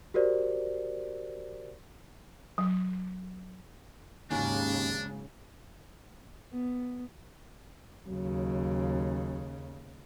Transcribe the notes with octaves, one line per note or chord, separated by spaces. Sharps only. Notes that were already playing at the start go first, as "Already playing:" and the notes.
F#4 G4 A#4 C5 D5
F#3
D#2 G#2 C#3 F#3 A#3 C#4 D4
B3
D#2 C#3 F#3